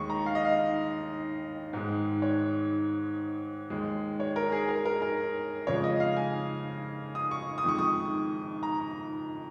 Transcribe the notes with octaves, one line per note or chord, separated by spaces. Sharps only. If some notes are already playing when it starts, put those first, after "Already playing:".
Already playing: D#2 D#3 G#3 C#6
A#5
F5
D#5
F5
G#2 D#3 G#3
C#5
D#2 D#3 G#3
C#5
A#4
G#4
A#4
A#4
A#4
F2 C#3 F3 G#3 C#5
D#5
F5
G#5
D#6
C#6
D#6
F2 D#3 G#3 C#6
D#6
A#5